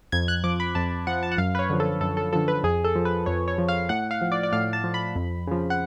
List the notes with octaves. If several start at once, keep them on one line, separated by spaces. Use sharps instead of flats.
F2 G#6
F#6
F3 D6
B5
F2 A5
F3 F#5
A5
F#5
F#2 F5
B4
C#5
D3 F3
A4
F#2 A4
A4
D3 F3 A4
B4
F2 G#4
A4
F3
B4
F2 C#5
C#5
F3
F5
A2 F#5
F5
F3
D5
D5
A2 F5
A5
F3
B5
F2
C#3 F3
F#5